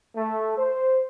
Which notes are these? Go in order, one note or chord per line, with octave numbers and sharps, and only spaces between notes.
A3
C5